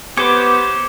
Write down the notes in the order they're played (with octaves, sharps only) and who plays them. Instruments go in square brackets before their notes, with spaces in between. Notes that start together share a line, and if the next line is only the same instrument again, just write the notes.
[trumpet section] B3 [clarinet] G4 [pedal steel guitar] C5 C#5 [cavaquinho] D6